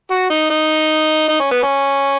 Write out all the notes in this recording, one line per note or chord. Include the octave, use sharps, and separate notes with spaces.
F#4
D#4
D#4
D#4
C#4
B3
C#4